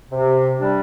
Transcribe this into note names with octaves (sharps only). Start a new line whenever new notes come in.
C3
G3 D4